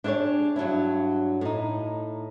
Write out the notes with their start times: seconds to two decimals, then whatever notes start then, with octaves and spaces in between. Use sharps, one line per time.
0.04 D4 E4 G4 G#4 C#5
0.56 G2 F#3 D4 E4
1.41 A2 D#4